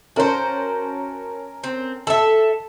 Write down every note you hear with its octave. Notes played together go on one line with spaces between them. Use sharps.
C#4 F#4 A#4 C5 A5
C4
A4 E5 A5